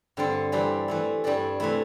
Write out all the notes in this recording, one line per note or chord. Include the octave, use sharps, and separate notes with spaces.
G2 D3 C4 A4
E3 G3 C4 G4
E3 A3 E4
G2 G3 D4 A4
C3 E3 A3 E4